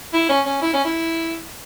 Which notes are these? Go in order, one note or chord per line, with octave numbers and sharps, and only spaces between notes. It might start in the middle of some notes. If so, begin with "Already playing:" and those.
E4
C#4
C#4
E4
C#4
E4